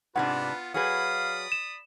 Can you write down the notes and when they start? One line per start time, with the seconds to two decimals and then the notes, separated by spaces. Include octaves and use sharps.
0.16 G#2 C3 B3 D4 F4 B4 F#5
0.74 F#3 G#4 B4 D5 F5 B5 D#6
1.52 E7